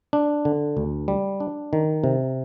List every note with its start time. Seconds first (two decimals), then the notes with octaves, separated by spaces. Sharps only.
0.13 D4
0.45 D3
0.77 D2
1.08 G3
1.40 D4
1.73 D#3
2.04 C3